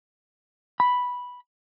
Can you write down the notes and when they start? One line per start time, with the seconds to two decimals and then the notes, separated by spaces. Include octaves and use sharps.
0.80 B5